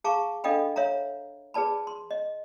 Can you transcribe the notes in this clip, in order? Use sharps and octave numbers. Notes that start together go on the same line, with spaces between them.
G#4 F5 A5 A#5 C#6 D6
D4 A4 D#5 F5 G5 B5
C#5 E5 F5 A#5
G#4 B4 D5 A5 B5
C6
D#5